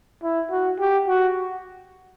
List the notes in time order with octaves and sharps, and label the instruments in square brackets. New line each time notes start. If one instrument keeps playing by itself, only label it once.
[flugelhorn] E4
F#4
G4
F#4